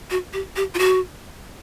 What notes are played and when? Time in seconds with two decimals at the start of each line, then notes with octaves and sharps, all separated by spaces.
0.10 F#4
0.33 G4
0.56 G4
0.74 F4
0.79 F#4